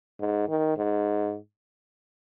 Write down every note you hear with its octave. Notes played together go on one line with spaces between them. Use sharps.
G#2
D#3
G#2